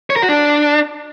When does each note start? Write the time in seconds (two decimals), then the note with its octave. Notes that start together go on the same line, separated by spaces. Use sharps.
0.10 C#5
0.16 A#4
0.22 F#4
0.29 D4